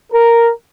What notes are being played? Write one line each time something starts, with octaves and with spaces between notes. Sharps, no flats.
A#4